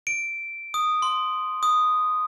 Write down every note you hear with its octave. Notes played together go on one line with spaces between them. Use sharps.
D7
D#6
C6
D#6